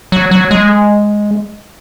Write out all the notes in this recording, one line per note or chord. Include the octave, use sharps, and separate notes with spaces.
F#3
F#3
G#3